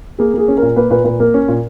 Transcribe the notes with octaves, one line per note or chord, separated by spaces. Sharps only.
A#3 G#4
A#3 G#4
C#4
A#4
A#2
A#3 B4
A#2 B4
A#2 B4
A#3 A#4
C#4
A#2